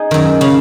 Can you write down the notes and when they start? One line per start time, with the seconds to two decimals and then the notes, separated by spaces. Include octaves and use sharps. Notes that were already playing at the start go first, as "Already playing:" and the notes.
Already playing: D#4 G#4
0.11 F#2 D#3
0.41 C#3